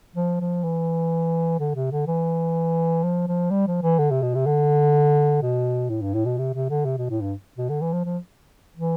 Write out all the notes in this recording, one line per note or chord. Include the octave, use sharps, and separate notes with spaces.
F3
F3
E3
D3
C3
D3
E3
F3
F3
G3
F3
E3
D3
C3
B2
C3
D3
B2
A2
G2
A2
B2
C3
C3
D3
C3
B2
A2
G2
B2
D3
E3
F3
F3
E3